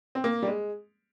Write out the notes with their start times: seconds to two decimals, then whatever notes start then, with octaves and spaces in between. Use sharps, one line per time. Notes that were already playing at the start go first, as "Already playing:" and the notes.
0.15 C4
0.24 A#3
0.42 G3
0.48 G#3